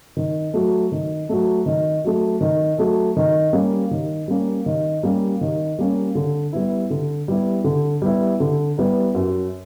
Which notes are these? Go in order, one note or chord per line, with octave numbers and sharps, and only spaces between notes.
D#3
F#3 A3
D#3
F#3 A3
D#3
F#3 A3
D#3
F#3 A3
D#3
G3 A#3 C#4
D#3
G3 A#3 C#4
D#3
G3 A#3 C#4
D#3
G3 A#3 C#4
D3
G3 B3 E4
D3
G3 B3 E4
D3
G3 B3 E4
D3
G3 B3 E4
F#2